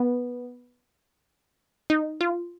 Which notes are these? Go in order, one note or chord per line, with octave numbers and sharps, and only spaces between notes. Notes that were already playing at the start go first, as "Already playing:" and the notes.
Already playing: B3
D#4
F4